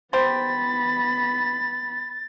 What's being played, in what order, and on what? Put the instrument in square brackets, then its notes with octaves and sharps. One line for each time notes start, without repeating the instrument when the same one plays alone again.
[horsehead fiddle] B3 B5 [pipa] G4 C5 [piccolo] A6